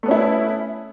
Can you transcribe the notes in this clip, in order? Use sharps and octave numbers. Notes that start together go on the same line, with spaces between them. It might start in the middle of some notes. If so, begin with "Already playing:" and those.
A3 B3 C#4 E4